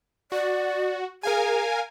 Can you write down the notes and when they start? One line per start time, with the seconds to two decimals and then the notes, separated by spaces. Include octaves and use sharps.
0.32 F#4 D5
1.23 G#4 A#4 F5 G#5